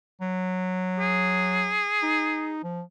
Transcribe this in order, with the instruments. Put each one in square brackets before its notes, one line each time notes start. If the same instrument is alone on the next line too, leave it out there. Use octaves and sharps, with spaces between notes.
[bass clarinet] F#3
[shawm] G#4
[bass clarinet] D#4
F3